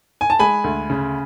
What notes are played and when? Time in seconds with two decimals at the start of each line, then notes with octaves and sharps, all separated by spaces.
0.21 G#5
0.30 A5
0.39 G#3 G#5 B5
0.64 D2
0.90 C#3